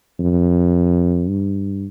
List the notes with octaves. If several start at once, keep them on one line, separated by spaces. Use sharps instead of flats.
F2
G2